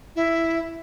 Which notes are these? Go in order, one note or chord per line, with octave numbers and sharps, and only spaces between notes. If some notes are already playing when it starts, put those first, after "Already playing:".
E4